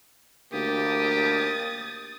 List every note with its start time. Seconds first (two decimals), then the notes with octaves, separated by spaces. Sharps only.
0.53 D2 A#3 G4 D#6 A6